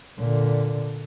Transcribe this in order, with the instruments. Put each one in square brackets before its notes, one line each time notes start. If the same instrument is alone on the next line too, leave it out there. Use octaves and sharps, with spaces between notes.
[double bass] A#2 D3